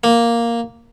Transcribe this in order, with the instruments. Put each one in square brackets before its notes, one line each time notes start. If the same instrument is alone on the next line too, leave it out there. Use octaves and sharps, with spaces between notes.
[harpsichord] A#3